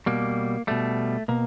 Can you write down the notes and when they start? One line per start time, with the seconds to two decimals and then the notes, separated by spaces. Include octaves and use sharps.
0.06 B2 G3 A#3
0.67 B2 G3 A3
1.28 B2 A#3